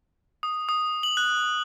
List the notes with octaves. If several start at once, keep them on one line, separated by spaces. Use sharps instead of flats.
D#6
D#6
F#7
F#6